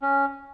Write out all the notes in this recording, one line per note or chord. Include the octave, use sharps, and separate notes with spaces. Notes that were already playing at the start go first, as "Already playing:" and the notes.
C#4